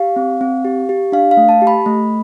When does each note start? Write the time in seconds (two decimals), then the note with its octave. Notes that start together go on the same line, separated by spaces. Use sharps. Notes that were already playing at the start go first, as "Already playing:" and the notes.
Already playing: G4 F5
0.16 C4
0.41 C4
0.64 G4
0.89 G4
1.12 D4 F5
1.31 F5
1.37 A3
1.49 A5
1.62 G4
1.67 B5
1.86 A3